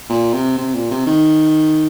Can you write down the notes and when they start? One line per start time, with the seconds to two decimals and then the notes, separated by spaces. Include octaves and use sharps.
0.09 A#2
0.33 C3
0.58 C3
0.75 A#2
0.91 C3
1.07 D#3